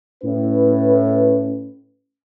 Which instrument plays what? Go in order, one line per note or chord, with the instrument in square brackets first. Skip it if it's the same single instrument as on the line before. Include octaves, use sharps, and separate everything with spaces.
[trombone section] A2 B4 [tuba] C#4